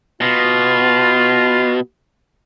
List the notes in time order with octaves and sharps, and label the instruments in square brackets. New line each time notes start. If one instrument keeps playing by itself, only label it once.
[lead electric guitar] B2 [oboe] F4